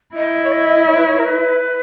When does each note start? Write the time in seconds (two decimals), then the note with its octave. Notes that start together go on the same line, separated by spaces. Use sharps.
0.15 E4 D#5
0.43 C#5
0.51 D#5
0.87 C#5
0.97 B4
1.05 C#5
1.18 A#4
1.25 B4